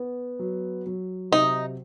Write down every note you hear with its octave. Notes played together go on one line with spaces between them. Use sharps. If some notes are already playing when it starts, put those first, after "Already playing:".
Already playing: B3
F#3
F#3
C3 D#4